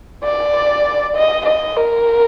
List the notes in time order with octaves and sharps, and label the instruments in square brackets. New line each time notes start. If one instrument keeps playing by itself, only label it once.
[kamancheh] D5
D#5
D#5
A#4